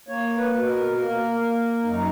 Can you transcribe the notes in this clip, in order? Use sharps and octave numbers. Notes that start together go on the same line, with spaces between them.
A#3 C#5
B4
B2
A#4
A#3 A#4
A#3
F#2 D#4